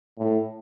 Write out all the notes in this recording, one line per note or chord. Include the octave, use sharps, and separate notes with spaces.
A2